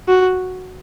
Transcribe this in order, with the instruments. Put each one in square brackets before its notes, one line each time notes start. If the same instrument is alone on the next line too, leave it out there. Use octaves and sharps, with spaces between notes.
[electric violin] F#4